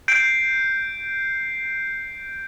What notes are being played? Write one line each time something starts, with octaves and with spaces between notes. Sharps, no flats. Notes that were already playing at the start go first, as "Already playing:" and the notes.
G6 C7 D7